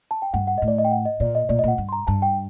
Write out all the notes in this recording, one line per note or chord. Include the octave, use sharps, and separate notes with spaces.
A5
G5
G2 F#5
F#5
A2 D#5
D5
D#5
G5
F#5
D#5
A#2 D5
D#5
A#2 D5
D#5
A#2 F#5
G2
C6
A#5
G2 A5
G5